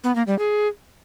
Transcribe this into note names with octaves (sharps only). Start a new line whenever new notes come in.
B3
A#3
G3
G#4